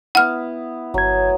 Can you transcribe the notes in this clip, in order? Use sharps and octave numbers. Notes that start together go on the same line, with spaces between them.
B3 E4 F#5 F6
G1 F#3 G#6